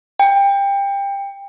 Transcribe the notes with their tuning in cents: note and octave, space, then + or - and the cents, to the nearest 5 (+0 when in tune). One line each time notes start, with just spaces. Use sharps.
G5 +25